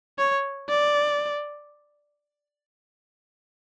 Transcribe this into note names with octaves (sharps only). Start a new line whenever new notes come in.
C#5
D5